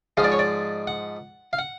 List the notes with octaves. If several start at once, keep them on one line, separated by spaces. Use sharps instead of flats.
G#2 F3 G#3 F5
D5
C#5
D5
F#5
F5
F#5